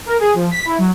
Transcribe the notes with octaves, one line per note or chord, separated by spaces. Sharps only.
A#4
G#4
F3
B6
E4
F#3